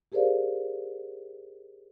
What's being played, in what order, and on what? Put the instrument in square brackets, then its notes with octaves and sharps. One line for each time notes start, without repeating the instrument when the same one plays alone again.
[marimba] G4 G#4 A#4 C5 D5 F5